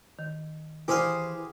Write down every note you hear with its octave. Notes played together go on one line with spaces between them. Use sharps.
D#3
E3 E4 G4 G#4 C5 F5